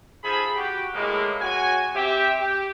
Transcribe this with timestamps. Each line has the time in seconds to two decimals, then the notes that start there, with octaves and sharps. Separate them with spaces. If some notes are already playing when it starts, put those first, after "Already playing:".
0.24 F3 D#4 G#4 A4 B5
0.56 F#4 G4
0.94 A2 G#3 A#3
1.41 G#3 C#4 F#4 G#5
1.95 C4 G4 E5
2.40 G4